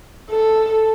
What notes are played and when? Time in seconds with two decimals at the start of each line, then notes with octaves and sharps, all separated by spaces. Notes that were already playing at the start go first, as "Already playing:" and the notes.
0.30 A4